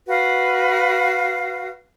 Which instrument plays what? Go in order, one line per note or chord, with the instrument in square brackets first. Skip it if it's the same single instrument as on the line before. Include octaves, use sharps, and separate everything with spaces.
[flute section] F#4 B4 F5